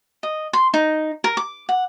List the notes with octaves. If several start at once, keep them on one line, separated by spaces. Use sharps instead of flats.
D#5
C6
D#4
A#4
D6
F#5